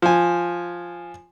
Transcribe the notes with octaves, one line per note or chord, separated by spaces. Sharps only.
F3 G#5